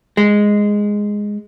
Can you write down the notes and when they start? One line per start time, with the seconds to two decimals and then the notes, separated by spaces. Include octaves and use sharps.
0.17 G#3